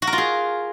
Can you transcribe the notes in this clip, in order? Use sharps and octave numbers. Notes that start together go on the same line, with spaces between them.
F#4
A#4
F4
G#4